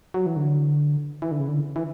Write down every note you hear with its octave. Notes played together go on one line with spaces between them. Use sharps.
F#3
E3
D3
E3
D3
C#3
D3
E3